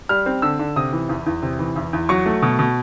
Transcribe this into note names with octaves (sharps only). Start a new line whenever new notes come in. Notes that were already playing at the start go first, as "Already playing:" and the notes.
G3 F6
C4
D3 E6
D3
C3 D#6
E3
E2
E2
C3
E3
E2
E2
F#3 C#6
A3
B2
B2